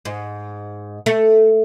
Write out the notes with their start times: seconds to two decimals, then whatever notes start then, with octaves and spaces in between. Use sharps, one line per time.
0.05 G#2
1.06 A3